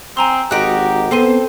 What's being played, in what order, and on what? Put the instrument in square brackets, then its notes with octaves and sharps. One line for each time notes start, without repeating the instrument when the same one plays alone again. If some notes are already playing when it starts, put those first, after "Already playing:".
[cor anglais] C4 [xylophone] G#5 A#5 C6
[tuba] G#1 [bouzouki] D#4 F#4 A#4 [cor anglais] G4 [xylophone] F#6 D7
[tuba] B3 [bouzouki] C4 C5 A5 [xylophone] A4 C6 D#7